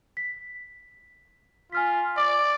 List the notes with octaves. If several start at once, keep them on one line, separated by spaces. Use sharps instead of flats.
B6
F4 G#5 F6 B6
D5 D6